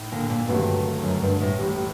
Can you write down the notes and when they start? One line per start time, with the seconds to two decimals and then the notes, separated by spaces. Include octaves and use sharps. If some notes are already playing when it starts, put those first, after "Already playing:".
Already playing: A2 A3 D#4
0.12 A#2 D3
0.30 A#2
0.48 D2 G2 C3 D#3 F#3 A3
1.03 F#2
1.22 G2
1.41 A2
1.58 A1 A2 G3